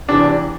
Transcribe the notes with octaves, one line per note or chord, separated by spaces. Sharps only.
E2 C3 E3 D4